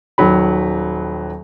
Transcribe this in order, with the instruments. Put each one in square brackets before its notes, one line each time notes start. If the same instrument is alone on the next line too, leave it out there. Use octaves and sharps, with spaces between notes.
[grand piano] D#1 D#3 F#3 B5